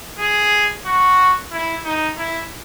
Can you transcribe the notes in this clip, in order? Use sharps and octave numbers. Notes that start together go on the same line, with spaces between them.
G#4
F#4
E4
D#4
E4